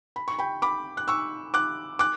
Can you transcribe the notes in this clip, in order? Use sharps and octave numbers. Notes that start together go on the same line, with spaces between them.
B5
C#6
G5 B5
B5 D6
F#6
C#6 E6
D6 F#6
D6 F#6